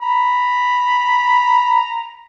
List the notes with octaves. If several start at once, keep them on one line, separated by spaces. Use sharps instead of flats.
A#5 B5